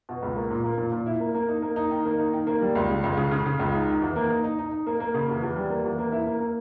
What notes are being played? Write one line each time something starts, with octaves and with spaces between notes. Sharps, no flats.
B2
C#2
A#3
A#2
A#3
A#2
A#2
E4
A#3
A#3
D#4
A#3
D#4
D#3
A#3
D#4
D#3
A#3
G3
C#2
C#3
C#2
C#3
C#3
C#3
C#2
D#4
D#3
E2
A#3
D#4
D#4
D#4
D#4
A#3
A#3
C#3
E2
E2
G3
A#3
E2
A#3
E4
A#3
A#3